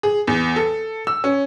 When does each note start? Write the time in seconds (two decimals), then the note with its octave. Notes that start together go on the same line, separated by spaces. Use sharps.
0.03 G#4
0.27 E2
0.56 A4
1.07 E6
1.24 C#4